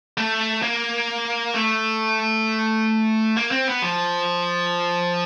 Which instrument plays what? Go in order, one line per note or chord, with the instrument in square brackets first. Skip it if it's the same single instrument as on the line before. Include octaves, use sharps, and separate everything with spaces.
[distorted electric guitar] A3
A#3
A3
A#3
C4
B3
F3